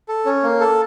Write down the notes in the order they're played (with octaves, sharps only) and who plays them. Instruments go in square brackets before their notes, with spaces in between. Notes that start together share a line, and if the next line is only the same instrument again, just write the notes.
[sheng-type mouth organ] A4
C#4
A#3
A4